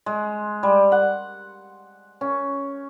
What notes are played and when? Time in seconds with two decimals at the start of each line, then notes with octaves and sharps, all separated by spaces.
0.06 G#3
0.63 G3
0.92 F#5
2.21 C#4